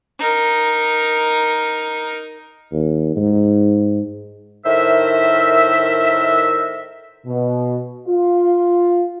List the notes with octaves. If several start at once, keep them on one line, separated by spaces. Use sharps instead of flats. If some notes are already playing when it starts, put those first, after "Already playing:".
D#4 A#4
D#2
G#2
A2 D#3 A#4 C5 E5
B2
F4